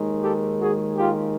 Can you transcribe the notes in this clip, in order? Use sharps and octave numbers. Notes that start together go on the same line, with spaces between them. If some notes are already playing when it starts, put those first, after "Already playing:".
Already playing: D#2 D#3 G#3
G4 A4
F#4 G#4
F4 G4